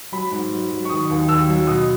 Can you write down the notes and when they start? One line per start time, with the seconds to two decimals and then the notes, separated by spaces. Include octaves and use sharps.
0.12 F#3 B5
0.31 G#2
0.52 F#3
0.71 F#3
0.85 C#6
0.90 D#3 D#6
1.10 D#2
1.29 D#2 E6
1.49 F#3
1.67 B2 D#6